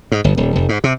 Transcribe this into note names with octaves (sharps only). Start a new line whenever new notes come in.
G#2
G1
D#1
F1
G#2
C3